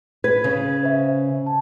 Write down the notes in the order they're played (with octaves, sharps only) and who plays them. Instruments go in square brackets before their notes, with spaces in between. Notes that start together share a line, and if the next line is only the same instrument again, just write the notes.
[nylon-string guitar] B4 [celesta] G#6
[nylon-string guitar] C#3
[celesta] C5 E5
A5